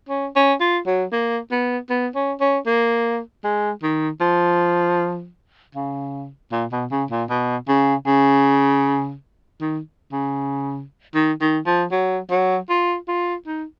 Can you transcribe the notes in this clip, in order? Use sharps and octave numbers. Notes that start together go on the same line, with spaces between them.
C#4
C#4
F4
F#3
A#3
B3
B3
C#4
C#4
A#3
G#3
D#3
F3
C#3
A#2
B2
C#3
A#2
B2
C#3
C#3
D#3
C#3
D#3
D#3
F3
F#3
F#3
F4
F4
D#4